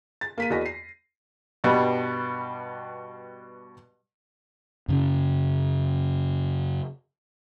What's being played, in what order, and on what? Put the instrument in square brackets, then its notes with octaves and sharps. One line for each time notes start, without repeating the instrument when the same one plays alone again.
[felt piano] A6
A#3 B6 D#7
E2 F#4 A#4 D#5 A#6
C7
[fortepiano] G2 B2 G3
[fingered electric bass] F#2 C#3 C#4